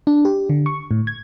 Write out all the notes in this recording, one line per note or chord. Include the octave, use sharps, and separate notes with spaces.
D4
G4
D3
C#6
A2
G#6